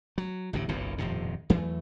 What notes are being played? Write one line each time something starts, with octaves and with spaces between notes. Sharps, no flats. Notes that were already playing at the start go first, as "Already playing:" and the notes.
F#3
A1 D2 A2 C#3
F#1 B1 A#2 C#3
D#1 F2 A2 C3
E2 E3 F#3 A3